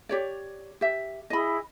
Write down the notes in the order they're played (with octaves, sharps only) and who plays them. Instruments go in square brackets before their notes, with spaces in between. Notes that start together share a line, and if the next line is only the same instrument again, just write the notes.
[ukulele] G4 C#5 D5
G4 E5
[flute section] E4 G#4 [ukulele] D#5 B5